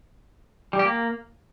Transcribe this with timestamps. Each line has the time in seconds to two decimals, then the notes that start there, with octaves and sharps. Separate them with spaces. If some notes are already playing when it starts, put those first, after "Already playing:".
0.73 G3
0.79 G4
0.85 A#3